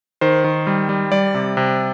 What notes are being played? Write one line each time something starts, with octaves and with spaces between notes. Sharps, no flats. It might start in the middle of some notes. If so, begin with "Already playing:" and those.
D#3 C5
D#3
G3
G3
G3 D5
C3
C3